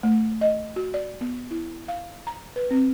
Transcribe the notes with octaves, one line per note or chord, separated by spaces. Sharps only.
A3
D#5
F#4
D5
B3
E4
F5
A#5
B4
C4